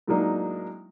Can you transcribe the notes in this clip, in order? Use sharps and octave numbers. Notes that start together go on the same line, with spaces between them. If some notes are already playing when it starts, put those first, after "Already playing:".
A2 F#3 G#3 A#3 D4 D#4